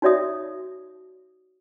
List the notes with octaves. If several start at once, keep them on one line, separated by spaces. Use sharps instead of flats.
D#4 F#4 C#5 D5 E5 D#6